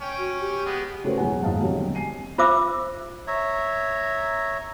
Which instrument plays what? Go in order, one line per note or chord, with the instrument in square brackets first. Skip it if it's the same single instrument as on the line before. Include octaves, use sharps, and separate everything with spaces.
[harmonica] C#4 G5
[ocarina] F#4
G4
[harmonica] G#3 B3
[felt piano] C#3 A3 F#4 G4 B4 C5
E1 F#3 G#4 F#5 G#5
D#1 G#2 D#5 F5 A5
E1 D3 F#3 G3 C4
G#5 C7 D#7
[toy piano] F4 C5 E5 D6 E6
[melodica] C#5 E5 A#5